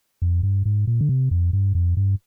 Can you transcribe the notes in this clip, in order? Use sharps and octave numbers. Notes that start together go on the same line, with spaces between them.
F2
G2
G#2
A#2
D3
C3
F2
G2
F2
G2